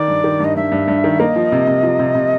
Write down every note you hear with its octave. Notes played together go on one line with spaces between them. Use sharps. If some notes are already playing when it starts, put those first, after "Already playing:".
Already playing: D#3 D5
G2
D#3
G2 D#5
G2 E5
G2
G2
D#3
A#3 D#5
F3
C3
C3
F3
C3
C3